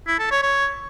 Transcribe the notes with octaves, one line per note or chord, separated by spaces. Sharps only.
E4
A4
C#5
C#5